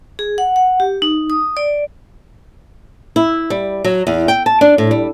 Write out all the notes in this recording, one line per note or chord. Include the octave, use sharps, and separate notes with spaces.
G#4
F#5
F#5
G4
D#4
D#6
D5
E4
G3
F#3
E2
G5
A5
D4
A2
G3